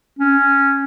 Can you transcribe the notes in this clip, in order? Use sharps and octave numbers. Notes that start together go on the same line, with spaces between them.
C#4